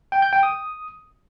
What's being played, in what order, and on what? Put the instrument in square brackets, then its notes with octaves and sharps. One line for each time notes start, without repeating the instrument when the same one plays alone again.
[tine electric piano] G5
G6
G5
D#6